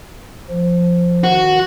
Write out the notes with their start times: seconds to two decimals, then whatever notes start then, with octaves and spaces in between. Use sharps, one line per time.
0.50 F3
1.24 D#3 F#4